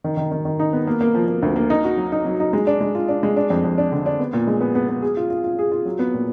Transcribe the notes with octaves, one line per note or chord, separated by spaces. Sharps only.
D#3
D#3
D#3
D#3
D#4
B3
A#3
A#3
F3
A#3
D2
A#3
D#4
F#4
F#3
D#4
F#3
D#4
G#3
D4
G#3
F4
D4
G#3
D4
F2
F2
D4
D3
D4
B3
A#2
G#3
B3
B3
B3
G#4
F4
F4
F4
G#4
F4
F#3
B3
A#2